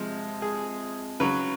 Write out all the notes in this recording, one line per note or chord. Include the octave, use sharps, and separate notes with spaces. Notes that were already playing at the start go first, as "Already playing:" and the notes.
Already playing: C3 F3 G#3
G#4
C#3 F#3 B4